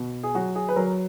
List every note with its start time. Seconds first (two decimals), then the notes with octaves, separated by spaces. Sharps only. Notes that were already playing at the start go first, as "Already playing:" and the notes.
Already playing: B2
0.23 G#4
0.35 F#3 F#4
0.55 G#4
0.69 B4
0.76 F#3 A#4